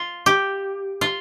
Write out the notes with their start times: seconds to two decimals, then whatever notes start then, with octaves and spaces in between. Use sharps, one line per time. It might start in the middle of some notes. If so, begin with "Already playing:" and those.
Already playing: F4
0.26 G4
1.01 F4